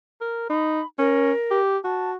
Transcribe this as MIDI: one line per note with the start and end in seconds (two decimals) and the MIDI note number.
0.21 0.46 70
0.50 0.81 63
0.50 0.86 83
0.99 1.32 61
0.99 1.59 70
1.51 1.78 67
1.84 2.16 66
1.84 2.11 81